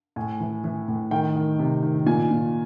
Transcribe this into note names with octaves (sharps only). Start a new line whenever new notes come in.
A2 G#5
E3
E3
A2
D#3 G5
D#3
C3
D#3
A#2 G#5
A#2